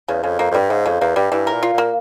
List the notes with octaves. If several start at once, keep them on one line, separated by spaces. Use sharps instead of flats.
E2 C#3
F2 C#3
F2 A#3
F2
G2 G3
G#2 C#3
F2 C#3
E2 A#3
G2 G3
G2 E3
A#4
A#2
F4
A#2 A#3